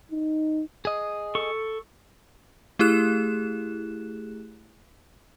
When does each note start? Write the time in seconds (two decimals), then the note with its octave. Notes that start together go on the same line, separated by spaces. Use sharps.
0.12 D#4
0.85 G#4 D#5
1.35 A4 C#6
2.79 A3 E4 G4 G#4 F#6 E7